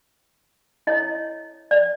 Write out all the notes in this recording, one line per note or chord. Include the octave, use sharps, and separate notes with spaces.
E4 A4 C#5 D#5
D5